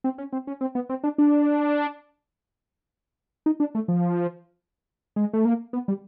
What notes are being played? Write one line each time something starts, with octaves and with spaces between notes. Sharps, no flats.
C4
C#4
C4
C#4
C4
B3
C4
D4
D4
D#4
D4
A3
F3
G#3
A3
A#3
B3
G3